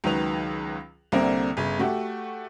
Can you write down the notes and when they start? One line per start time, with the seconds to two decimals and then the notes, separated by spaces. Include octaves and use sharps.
0.04 C#2 D#3 F#3 B4 F7
1.12 C2 D3 A#3 C4 A#4
1.57 G1 C#3
1.79 A3 F#4 G4 A4